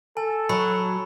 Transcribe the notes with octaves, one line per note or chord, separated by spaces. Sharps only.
A4 G#5
F#3 A#5 B5